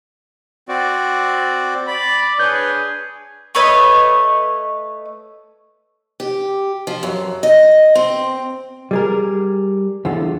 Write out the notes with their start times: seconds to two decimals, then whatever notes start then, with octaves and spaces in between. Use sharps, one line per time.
0.69 C4 F#4 D5
1.87 D5 B5
2.39 D4 G#4 B4 C#5 G6
3.55 A3 B4 C#5 D#5
6.20 G4
6.87 F3
7.03 F#2
7.43 D#5
7.95 C4
8.91 G3 G#4 A#4
10.05 E2 D3 F4